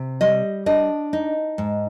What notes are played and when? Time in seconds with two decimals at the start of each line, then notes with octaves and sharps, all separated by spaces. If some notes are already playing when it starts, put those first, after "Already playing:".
Already playing: C3
0.21 G3 D#5
0.66 D4 D#5
1.13 D#4
1.58 G#2